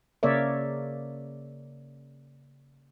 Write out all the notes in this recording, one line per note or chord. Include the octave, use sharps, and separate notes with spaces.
C#3 A#3 A#4 C#5 D5 E5